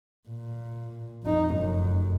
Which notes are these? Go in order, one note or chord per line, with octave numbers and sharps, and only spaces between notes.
A#2
F2 D#4
F1 F#2